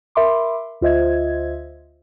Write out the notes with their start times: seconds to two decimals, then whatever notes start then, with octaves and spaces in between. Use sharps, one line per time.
0.15 A#4 E5 B5 C6 D6
0.81 D2 F4 C5 D#5 E5 G#6